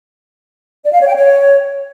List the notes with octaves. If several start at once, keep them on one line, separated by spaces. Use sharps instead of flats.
D5
F5
C#5
G5
C#5